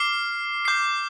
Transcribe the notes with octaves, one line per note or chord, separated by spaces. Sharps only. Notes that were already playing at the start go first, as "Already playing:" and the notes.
Already playing: D6 F6 C7
D6 G6 C7